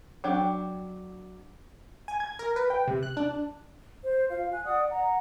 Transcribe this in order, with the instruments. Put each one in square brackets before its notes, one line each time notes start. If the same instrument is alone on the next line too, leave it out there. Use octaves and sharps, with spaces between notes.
[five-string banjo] F#3 D4 G5
[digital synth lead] G#5
G#6
A#4
B4
G5
C3
F#6
D4
[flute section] C5
F4 F5
G#5 F#6
D5 F#5 D#6
F#5 A#5